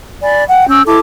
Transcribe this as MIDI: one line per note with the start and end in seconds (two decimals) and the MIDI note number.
0.23 0.43 74
0.23 0.43 80
0.23 0.43 83
0.49 0.67 78
0.49 0.67 79
0.68 0.82 61
0.68 0.82 88
0.68 0.82 91
0.86 0.99 64
0.86 0.99 69
0.86 0.99 81
0.86 0.99 86